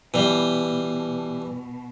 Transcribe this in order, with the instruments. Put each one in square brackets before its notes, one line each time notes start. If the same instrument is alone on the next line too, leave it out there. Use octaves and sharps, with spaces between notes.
[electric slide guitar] B2 [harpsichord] E3 G3